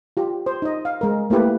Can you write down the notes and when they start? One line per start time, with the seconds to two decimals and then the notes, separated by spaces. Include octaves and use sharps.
0.17 F4 G4
0.46 C5
0.62 D#4 D#5
0.85 F5
1.01 G#3 A#4
1.30 A3 A#3 E4 G4 B4